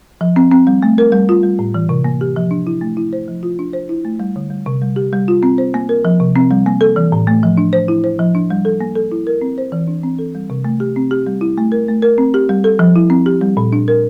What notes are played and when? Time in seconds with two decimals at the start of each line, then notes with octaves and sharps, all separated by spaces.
0.21 F3
0.36 C4
0.51 C4
0.67 G3
0.82 A3
0.98 A#4
1.12 G3
1.29 F4
1.43 G3
1.59 A2
1.74 E3
1.89 C3
2.04 A#3
2.21 G4
2.36 F3
2.51 D4
2.67 E4
2.81 A3
2.97 E4
3.13 C5
3.28 F3
3.43 F4
3.59 D4
3.73 C5
3.89 E4
4.05 A3
4.20 G3
4.36 D3
4.50 G3
4.66 C3
4.82 G3
4.96 G4
5.13 G3
5.28 F4
5.43 C4
5.58 C5
5.74 A#3
5.89 A#4
6.05 F3
6.20 C3
6.36 C4
6.51 G3
6.66 A#3
6.81 A4
6.96 E3
7.12 A2
7.27 A3
7.43 F3
7.57 D4
7.73 C5
7.88 E4
8.04 C5
8.19 F3
8.35 D4
8.50 G3
8.65 A4
8.81 A#3
8.95 A4
9.12 E4
9.27 A#4
9.41 C4
9.58 C5
9.72 E3
9.87 D4
10.03 C4
10.19 A4
10.35 G3
10.50 C3
10.64 A3
10.80 G4
10.96 C4
11.11 G4
11.26 G3
11.41 E4
11.58 A3
11.72 A#4
11.88 A3
12.02 A#4
12.18 C4
12.34 G4
12.49 G3
12.64 A4
12.79 F3
12.96 E4
13.10 C4
13.26 G4
13.41 G3
13.57 A#2
13.73 D4
13.88 A#4